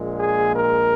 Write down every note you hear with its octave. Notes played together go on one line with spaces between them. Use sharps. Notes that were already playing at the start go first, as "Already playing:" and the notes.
Already playing: A#1 A#2 G#3
G#4
A#4